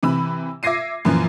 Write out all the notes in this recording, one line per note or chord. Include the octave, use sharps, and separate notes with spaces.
C3 E3 B5 E6
E5 D6 G#6 A#6 C7 D#7
F#2 A#2 E3 F3